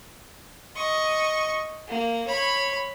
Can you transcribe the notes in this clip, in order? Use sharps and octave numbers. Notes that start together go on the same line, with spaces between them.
D#5 C#6
A#3
C#5 B5